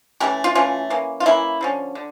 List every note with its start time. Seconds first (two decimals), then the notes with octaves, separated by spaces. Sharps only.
0.20 E3 A3 C#4 G4 A#4
0.44 F4
0.55 E3 A3 C#4 F4
0.90 E3 A#3 C#4
1.20 F4
1.26 E3 A#3 C#4 E4
1.61 D3 F3 C#4
1.95 D3